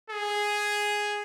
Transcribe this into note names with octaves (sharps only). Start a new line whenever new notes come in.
G#4